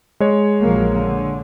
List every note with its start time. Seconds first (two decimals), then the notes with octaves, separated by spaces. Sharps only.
0.20 G#3 C#5
0.62 A#1 F#3 A#3
0.96 D3